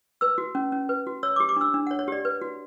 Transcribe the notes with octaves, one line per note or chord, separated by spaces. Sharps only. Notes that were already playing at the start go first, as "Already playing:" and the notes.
B4 E6
F#4
C#4
C#4
B4
F#4
C#5 E6
D6
G4
D6
D4 E6
D4
C#5 F#5
C#5
G4 D5
B4
F#4